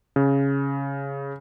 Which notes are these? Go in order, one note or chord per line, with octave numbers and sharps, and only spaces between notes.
C#3